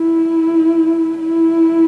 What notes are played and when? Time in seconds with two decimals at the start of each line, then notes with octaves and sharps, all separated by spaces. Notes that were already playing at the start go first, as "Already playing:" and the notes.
Already playing: E4
1.21 E4